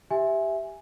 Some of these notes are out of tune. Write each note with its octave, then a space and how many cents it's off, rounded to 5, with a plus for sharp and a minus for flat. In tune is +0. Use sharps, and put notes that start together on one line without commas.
G4 +0 E5 +0 G#5 +0